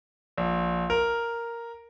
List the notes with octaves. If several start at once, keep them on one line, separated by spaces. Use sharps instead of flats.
A#1
A#4